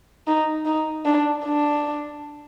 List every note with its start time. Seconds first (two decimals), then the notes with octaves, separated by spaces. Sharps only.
0.27 D#4
0.66 D#4
1.06 D4
1.45 D4